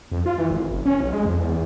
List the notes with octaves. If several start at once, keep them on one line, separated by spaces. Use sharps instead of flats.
F2
F4
E3
G#1
F#1
C#4
B1
G#3
F2
E2